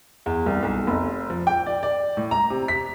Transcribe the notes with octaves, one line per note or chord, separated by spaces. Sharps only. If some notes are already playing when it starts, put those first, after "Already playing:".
E2
C2
B1
F1
F3
G5
D5
D5
A2
A#5
C3
B6